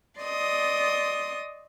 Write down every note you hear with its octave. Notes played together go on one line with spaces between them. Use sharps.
D5 D#5 C6 D#6